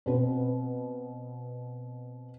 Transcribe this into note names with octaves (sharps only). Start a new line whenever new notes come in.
B2 C4 B4